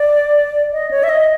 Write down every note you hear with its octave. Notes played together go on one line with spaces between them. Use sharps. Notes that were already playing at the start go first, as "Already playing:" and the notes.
Already playing: D5
D#5
C#5
E5
D#5